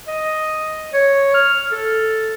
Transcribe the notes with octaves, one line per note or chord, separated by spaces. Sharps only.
D#5
C#5
F6
A4